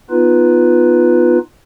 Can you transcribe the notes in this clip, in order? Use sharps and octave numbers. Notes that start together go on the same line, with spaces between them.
B3 D#4 F4 B4